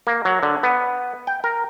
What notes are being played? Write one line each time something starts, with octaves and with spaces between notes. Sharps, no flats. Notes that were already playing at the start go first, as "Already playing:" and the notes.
A#3
F#3
D3
B3
G5
A#4